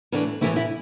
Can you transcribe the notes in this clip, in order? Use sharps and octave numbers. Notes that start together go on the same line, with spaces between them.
A2 E3 A3 D4
A2 E3 A3 E4
E4